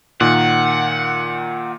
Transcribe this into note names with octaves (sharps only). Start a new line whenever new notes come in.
A#2 D#3 F#5